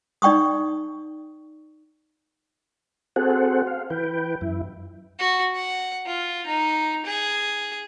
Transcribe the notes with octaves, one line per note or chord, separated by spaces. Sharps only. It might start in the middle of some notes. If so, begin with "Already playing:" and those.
D#4 D5 G5 C#6 D#6
C4 F#4 G#4 A4 C5 F#5
F5
E3 B4 G5
F#2 E4
F#4
F#5
F4
D#4
G#4